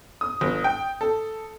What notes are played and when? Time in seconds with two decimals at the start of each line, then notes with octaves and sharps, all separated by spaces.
0.21 D#6
0.41 G1
0.64 G5
1.01 A4